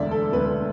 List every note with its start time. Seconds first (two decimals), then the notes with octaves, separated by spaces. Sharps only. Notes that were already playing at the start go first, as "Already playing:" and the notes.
Already playing: E1 D2 D3 D5 E5
0.11 A4
0.32 E1 D2 D3 B4